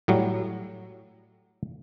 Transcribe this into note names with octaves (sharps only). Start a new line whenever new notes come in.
A2 F#3 G3